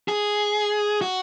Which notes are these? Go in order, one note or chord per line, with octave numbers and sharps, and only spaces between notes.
G#4
F#4